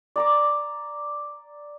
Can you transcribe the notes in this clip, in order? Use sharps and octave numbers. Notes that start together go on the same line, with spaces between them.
D5 A#5 D6